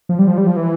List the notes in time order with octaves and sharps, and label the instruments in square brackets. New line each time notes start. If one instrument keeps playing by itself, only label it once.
[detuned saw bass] F3
G3
F3
G3
F3
E3